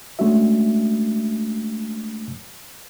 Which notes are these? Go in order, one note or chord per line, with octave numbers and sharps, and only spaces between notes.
G#3 A3 C#4 D4 F#4 E5